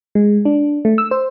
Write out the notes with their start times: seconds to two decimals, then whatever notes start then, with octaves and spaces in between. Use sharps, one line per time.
0.15 G#3
0.45 D4
0.85 A3
0.98 E6
1.11 C5